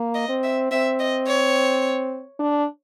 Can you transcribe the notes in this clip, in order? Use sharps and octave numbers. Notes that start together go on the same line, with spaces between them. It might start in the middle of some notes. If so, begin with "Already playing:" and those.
Already playing: A#3
D#5
C4
E5
C4 E5
D#5
C#5
D4